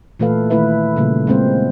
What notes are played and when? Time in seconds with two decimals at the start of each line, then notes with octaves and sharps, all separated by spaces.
0.20 A#2 E3 A3 A4 B4 F5
0.50 D#3 A3 E4 B4 E5
0.96 A#2 C#3 G3 A#3
1.27 G#3 A#3 C4 C5